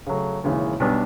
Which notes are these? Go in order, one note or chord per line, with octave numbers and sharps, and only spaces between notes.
C#3 F#3 A3
E1 D#2 C#3 E3
B1 B2 G3 B3 D4